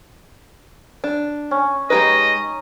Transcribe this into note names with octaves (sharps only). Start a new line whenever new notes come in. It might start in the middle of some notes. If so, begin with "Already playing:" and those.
D4
C#4
G#3 D#4 G4 B4 D#5